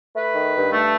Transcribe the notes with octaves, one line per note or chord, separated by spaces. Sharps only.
A3 B4
D#3
G2
A3